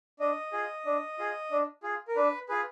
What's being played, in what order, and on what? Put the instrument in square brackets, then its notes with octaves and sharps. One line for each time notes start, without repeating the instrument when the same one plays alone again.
[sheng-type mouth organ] D4 D#5
F4 G#4
D4
F4 G#4
D4
F4 G#4
A#4
D4 B4
F4 G#4 B4